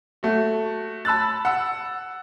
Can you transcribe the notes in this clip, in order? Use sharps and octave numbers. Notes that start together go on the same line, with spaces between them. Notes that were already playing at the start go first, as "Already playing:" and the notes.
A3 F#4
A5 B5 E6 F#6 A6
F#5 E6